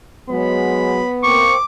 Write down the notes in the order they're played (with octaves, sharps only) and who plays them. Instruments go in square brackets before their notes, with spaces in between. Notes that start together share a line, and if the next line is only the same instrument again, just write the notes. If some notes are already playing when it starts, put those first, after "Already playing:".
[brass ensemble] F#3 G#3 [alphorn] B3 [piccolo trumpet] B5
[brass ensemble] A#3 C4 [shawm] C#6 [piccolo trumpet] D6